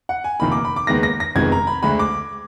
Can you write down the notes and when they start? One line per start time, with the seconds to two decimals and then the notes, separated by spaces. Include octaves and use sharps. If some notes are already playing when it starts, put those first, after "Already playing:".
0.09 F#5
0.24 G#5
0.40 F1 F2 D#3 A#3 B5
0.52 D6
0.65 B5
0.76 D6
0.87 D#2 D#3 G#3 B3 A#6
1.03 A#6
1.20 A#6
1.35 F1 F2 D#3 G#3 B3 G#6
1.52 A#5
1.67 B5
1.83 D2 D3 G#3 B5
1.99 D6